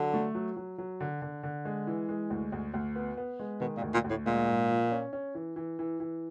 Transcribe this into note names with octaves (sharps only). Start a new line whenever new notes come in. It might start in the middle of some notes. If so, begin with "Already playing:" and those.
Already playing: D3 F#3
A3
F#3
F#3
F#3
D3
D3
D3
G#3
E3
G#3
D2
D2
D2
B3
B3
G#3
B2 D#3
A#2
D2
A#2
D2
A2
A#2 G#3
G#2
F3
C#4
C#4
E3
E3
E3
E3